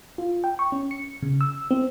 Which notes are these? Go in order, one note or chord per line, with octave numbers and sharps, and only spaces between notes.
F4
G5
C#6
C#4
C#7
C#3
E6
C4